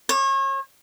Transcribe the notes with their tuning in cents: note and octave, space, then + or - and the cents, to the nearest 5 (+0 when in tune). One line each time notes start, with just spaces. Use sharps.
C#5 -35